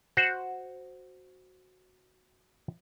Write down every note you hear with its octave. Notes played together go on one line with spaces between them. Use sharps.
F#4 C5 F#5